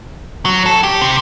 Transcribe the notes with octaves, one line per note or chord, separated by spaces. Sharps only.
F#3
A4
G4
C3